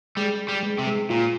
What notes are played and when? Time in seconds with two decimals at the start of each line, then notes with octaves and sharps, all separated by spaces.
0.17 G3 G#3
0.48 G3
0.63 G#3
0.78 C3
0.87 G#3
1.10 A#2 F4